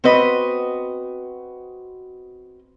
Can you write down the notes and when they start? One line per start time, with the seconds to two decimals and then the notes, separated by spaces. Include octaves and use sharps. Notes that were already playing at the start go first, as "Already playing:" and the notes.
0.04 C4 F#4 B4 D#5 B5